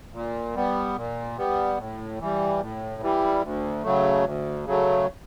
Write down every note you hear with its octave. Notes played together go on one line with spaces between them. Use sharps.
A#2
G3 B3
A#2
G3 B3
A2
E3 G3
A2
E3 G3
D2
C#3 F#3 A3
D2
C#3 F#3 A3